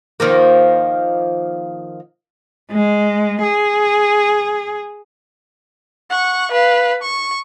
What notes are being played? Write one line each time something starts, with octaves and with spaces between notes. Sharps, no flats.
D#3 F3 A#3
G#3
G#4
F#5 C#6
B4 F5
C#6